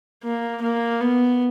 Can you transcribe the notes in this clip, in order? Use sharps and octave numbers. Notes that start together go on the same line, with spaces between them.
A#3
A#3
B3